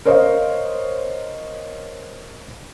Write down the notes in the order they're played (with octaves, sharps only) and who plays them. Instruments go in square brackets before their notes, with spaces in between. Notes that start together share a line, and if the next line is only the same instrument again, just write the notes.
[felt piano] A#4 C5 C#5 D#5 F5